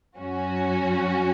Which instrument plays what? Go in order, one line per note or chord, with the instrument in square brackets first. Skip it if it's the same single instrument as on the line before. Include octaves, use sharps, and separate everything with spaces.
[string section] F#2 F#3 C#4 F#4